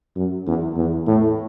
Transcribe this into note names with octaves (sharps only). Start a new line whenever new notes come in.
F#2
E2
E2
A2